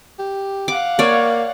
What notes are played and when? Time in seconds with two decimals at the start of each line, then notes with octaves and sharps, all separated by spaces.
0.19 G4
0.68 F5 F#5 D6
0.99 A#3 C#5 D5